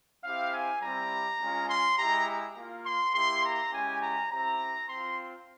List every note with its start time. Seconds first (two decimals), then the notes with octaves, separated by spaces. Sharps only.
0.24 C4 E4 G4 F5
0.53 G#5
0.82 G3 C4 E4 G4 A#5
1.40 G#3 C#4 F4
1.69 C6
1.99 G#3 E4 G4 A#5
2.56 A#3 F4
2.85 C6
3.14 A#3 E4 G4 C6
3.44 A#5
3.73 G#3 C#4 E4 G4 G#5
4.01 A#5
4.31 C4 E4 G4 A#5
4.89 C4 F4 C6